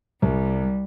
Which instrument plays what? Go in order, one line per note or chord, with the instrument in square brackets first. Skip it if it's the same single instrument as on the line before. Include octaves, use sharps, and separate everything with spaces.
[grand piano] C2 [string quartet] G3